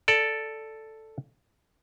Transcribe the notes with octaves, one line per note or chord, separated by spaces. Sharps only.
A4 D5